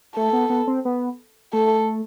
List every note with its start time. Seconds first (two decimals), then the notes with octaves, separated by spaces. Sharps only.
0.16 A3 A4
0.33 B3
0.50 B3
0.67 C4
0.85 B3
1.53 A3 A4